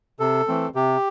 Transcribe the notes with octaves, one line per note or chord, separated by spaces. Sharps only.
C3 A4
E3 A3 C4
C3 G4